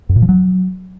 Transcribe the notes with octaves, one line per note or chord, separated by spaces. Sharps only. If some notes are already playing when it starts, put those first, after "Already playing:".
F#2
A#2
F3
F#3